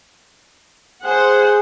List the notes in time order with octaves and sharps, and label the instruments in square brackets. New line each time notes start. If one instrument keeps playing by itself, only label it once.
[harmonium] G#4 [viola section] C5 F#5